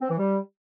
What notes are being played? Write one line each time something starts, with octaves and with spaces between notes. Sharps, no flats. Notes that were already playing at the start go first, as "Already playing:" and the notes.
C4
E3
G3